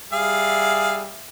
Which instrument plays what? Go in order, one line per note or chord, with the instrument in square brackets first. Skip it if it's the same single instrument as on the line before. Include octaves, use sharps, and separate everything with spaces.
[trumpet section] G3 E5 [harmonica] G#4 F5